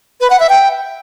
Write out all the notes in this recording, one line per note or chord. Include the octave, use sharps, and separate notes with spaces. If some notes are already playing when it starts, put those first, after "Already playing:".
B4
F#5
E5
G5